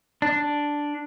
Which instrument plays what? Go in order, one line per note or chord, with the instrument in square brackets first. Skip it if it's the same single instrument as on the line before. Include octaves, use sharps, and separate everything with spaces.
[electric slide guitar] D4